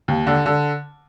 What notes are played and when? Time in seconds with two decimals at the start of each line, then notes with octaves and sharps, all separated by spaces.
0.08 D#2
0.27 D3
0.46 D3